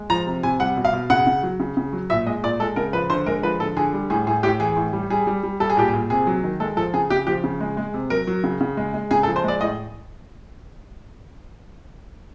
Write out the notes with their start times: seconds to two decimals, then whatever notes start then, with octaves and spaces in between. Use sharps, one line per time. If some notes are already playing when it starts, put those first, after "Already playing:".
Already playing: G#3
0.10 F3 A#5
0.27 C3
0.43 C3 G#5
0.60 G3 F#5
0.77 B2
0.85 F5
0.93 B2
1.10 C#3 F#5
1.27 C#3
1.43 F#3
1.60 C#3
1.77 C#3
1.93 F#3
2.10 A#2 E5
2.26 G#3 D#5
2.43 A#2 D5
2.60 G#3 A4
2.76 C#3 A#4
2.93 F3 B4
3.10 D3 C5
3.26 G#3 A#4
3.43 F3 B4
3.60 D3 A4
3.77 D3 G#4
3.93 G3
4.10 A2 G#4
4.27 A2 G#4
4.43 A2 G4
4.60 E3 G#4
4.77 A2
4.93 G3
5.10 G3 G#4
5.27 G3
5.43 G3
5.60 G3 A4
5.70 G#4
5.77 A#2 G4
5.88 G#4
5.93 A#2
6.10 C3 G#4
6.27 F#3
6.43 D#3
6.60 G#3 A4
6.77 F3 A4
6.94 C#3 G#4
7.10 C#3 G4
7.27 F3 G4
7.44 C#3
7.61 G#3
7.77 G#3
7.94 C3
8.10 F#3 A#4
8.27 F#3
8.44 C#3
8.60 C#3
8.77 G#3
8.94 G#3
9.11 C#3 G#4
9.23 A4
9.28 F3
9.36 C5
9.44 G#3 D5
9.61 A2 D#5